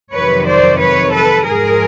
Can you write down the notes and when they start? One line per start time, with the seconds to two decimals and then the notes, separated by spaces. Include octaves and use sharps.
0.12 F2 C3 D#3 F#3 B4 C#5
0.46 C5 D5
0.79 B4 C#5
1.13 A4 B4
1.46 G#2 F3 G#4 A#4